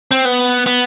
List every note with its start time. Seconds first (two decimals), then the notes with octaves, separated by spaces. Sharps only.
0.11 C4
0.25 B3
0.66 B3